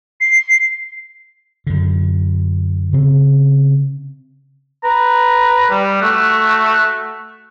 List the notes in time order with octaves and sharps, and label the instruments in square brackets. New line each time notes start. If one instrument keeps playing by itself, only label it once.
[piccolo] C7
[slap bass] F#2 D3
C#3 C4
[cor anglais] B4 [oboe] A#5
[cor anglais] G3
[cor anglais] A3 [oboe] F#4